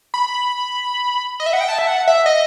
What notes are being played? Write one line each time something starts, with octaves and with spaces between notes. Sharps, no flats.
B5
D#5
E5
F#5
G5
A5
E5
F#5
E5
D#5